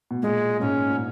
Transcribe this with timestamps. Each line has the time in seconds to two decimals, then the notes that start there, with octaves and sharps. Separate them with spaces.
0.11 B2
0.22 A#2 G#3
0.61 G#2 C#4
0.90 A#2